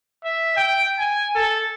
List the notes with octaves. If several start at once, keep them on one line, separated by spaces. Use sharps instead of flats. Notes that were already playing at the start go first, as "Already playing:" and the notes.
E5
G5
G#5
A4